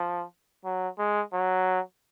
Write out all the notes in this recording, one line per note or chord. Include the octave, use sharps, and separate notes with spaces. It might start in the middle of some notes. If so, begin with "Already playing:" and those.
Already playing: F3
F#3
G#3
F#3